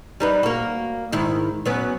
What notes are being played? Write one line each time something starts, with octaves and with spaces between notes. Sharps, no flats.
G3 D#4 B4
A#3 F#4
G#2 D#3 E4
F#3 B3 C#4